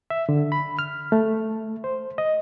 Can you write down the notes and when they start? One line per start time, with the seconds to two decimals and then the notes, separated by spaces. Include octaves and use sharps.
0.10 E5
0.29 D3
0.52 B5
0.79 F6
1.12 A3
1.84 C5
2.18 D#5